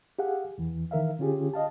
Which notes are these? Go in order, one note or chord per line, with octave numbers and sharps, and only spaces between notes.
G4 G#4 F5 F#5
E2 E3
D#3 E3 A#4 E5 F5
D3 C#4 F4 G4 G#4
D#5 F5 A5